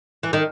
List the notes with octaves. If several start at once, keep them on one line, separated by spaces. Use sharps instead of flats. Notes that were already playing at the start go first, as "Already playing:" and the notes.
E3
D#3